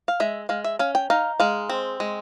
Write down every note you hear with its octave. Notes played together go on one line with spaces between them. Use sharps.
F5
G#3 E5
G#3 F5
E5
C#4 F5
G5
D#4 F5
G#3 F5
C4
G#3